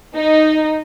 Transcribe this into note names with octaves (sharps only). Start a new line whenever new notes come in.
D#4